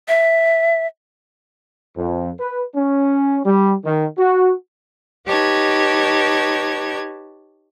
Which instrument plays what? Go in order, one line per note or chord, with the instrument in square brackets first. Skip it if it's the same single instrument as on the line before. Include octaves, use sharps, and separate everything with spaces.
[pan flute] E5
[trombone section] F2
B4
C#4
G3
D#3
F#4
[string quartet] D#4 G4 B4 C#5 A5 G#6